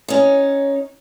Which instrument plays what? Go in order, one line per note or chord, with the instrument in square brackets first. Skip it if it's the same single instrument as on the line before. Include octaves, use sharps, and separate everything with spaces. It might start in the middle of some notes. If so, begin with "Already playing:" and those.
[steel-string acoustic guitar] C#4 D#4